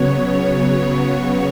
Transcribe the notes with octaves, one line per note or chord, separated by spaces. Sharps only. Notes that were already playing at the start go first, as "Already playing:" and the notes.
Already playing: C#3 F#3 B3 C#5